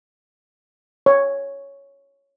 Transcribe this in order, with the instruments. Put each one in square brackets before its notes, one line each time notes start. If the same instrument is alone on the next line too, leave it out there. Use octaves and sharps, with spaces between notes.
[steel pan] C#5